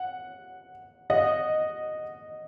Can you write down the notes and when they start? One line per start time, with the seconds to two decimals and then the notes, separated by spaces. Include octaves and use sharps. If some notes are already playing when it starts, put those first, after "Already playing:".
Already playing: F#5
1.10 D#5 F#5